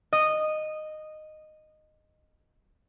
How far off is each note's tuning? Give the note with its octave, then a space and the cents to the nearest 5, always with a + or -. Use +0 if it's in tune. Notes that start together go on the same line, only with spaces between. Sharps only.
D#5 -10